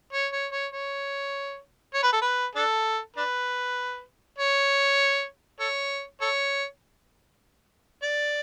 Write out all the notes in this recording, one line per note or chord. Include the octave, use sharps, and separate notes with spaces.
C#5
C#5
C#5
C#5
C#5
B4
A4
B4
D4 A4
D4 B4
C#5
A4 C#5
A4 C#5
D5